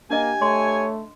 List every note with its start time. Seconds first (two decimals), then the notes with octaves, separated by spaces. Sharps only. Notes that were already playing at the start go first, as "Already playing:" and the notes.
0.11 A#3 D4 G4 D#5 G#5
0.42 A3 C#5 C6